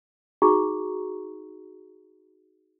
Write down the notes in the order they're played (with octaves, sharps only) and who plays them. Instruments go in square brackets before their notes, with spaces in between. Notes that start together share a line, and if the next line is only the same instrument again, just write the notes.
[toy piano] D#4 F#4 G#4 A#5 C#6